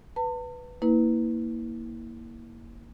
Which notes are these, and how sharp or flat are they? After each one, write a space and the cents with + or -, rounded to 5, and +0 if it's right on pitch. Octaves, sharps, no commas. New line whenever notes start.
B4 +0 A5 +45
A#3 +0 E4 -30 B4 +0